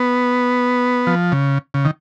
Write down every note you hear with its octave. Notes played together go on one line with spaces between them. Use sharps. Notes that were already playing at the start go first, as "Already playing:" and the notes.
Already playing: B3
F3
C#3
C#3
D#3